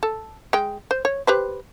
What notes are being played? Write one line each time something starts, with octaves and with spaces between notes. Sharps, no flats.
A4
G#3 G5
C5
C#5
G4 B4 C5